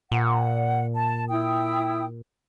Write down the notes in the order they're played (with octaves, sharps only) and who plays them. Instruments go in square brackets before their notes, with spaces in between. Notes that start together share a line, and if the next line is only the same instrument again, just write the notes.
[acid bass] A#2 [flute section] F#5
[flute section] A5
E4 G5 D#6